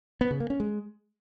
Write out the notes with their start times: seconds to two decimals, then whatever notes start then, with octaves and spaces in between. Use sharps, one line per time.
0.21 B3
0.31 C#3
0.40 A#3
0.50 C#4
0.60 G#3